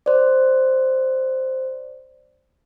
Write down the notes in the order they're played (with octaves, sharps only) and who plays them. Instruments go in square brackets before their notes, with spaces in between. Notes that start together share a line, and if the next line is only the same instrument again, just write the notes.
[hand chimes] C5 D5